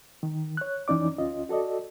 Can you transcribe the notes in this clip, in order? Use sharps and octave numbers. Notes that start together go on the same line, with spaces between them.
D#3
C#5 F#6
F2 E3 C#4 D#4 D5 D6
D2 C#4 F4 D#5
F#4 A4 D5 D#5